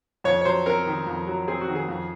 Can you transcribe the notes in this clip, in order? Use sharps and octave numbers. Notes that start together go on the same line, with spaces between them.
F2 C#5
C#5
F#3 C5
C4 A#4
D#3
F2
F#3
C4 G#4
F#4
D#3
G#4
F2